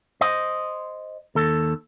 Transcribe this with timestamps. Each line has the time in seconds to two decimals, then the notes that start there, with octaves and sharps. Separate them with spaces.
0.21 C5 D#5
1.35 D#2 A4